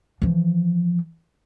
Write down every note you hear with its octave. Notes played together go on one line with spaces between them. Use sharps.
E3 F3